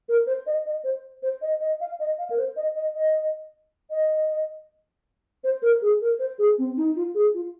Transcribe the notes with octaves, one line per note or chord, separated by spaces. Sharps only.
A#4
C5
D#5
D#5
C5
C5
D#5
D#5
F5
D#5
F5
A#4
C5
D#5
D#5
D#5
D#5
C5
A#4
G#4
A#4
C5
G#4
C4
D#4
F4
G#4
F4